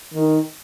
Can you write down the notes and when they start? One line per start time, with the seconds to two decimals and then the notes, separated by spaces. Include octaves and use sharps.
0.14 D#3